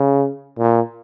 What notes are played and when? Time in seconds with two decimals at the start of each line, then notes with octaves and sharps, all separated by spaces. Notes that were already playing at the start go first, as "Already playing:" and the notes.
Already playing: C#3
0.58 A#2